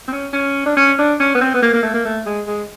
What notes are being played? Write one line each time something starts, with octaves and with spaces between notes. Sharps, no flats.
C4
C#4
C#4
D4
C#4
D4
C#4
B3
C4
B3
A#3
A#3
A3
A#3
A3
G#3
G#3